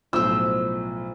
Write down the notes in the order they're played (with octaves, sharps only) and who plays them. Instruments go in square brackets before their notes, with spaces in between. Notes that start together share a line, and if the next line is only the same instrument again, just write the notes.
[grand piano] B1 A2 [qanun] F3 C5 [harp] E6